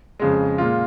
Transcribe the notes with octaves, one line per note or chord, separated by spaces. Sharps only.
F2 C#3 G#3
A#2 G#3 F4